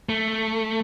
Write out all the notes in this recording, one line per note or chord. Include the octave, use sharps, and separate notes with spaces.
A3